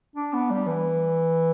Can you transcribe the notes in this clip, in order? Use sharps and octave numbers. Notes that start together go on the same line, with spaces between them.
D4
B3
G3
E3